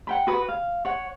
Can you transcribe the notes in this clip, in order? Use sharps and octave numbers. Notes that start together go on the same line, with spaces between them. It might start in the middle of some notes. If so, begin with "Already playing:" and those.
F#5 G5 B5
F#4 B4 D#6
F5
C#5 F#5